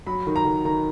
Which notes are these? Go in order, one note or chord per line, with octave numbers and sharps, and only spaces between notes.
F#3 B5
D#3
A#5
D#3
D#3 A#5